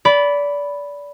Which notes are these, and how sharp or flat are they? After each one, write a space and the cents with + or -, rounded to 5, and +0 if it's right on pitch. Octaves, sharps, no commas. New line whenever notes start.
D5 -25 B5 +0